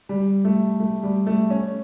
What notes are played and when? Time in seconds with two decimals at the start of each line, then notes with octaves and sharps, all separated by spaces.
0.09 G3
0.45 A3
0.80 A3
1.03 G3
1.27 A3
1.50 C#4